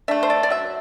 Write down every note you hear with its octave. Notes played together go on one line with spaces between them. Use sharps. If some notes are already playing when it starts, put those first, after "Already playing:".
A3 D4 E5
C5
D5
D5
F#3 E5